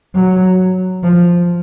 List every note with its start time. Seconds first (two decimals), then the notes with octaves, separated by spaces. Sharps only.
0.15 F#3
1.04 F3